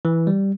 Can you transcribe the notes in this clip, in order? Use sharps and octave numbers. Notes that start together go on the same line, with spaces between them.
E3
G3